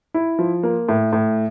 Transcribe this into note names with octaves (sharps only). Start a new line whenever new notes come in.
E4
F3
A#3
A2
A2